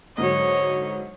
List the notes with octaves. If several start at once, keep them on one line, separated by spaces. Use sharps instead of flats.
G#2 D3 F#3 C#5 D#5